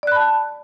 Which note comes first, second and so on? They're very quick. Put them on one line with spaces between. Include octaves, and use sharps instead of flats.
D5 F#6 B5 A5